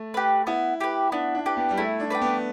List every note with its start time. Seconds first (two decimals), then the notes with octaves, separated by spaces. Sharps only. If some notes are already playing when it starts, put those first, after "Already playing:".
Already playing: A3
0.14 G4 B4
0.47 B3 E4
0.81 G4 B4
1.12 B3 D4
1.35 D4
1.46 G4 B4
1.57 B3
1.70 G3
1.78 A3 E4
2.00 D4
2.10 B4 D5 G5
2.21 B3